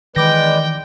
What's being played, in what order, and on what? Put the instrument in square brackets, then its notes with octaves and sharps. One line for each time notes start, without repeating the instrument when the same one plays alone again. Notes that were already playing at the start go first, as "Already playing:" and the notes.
[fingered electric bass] D#3 [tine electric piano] E3 D6 A#6 [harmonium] G#3 B4 D5 [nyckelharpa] G5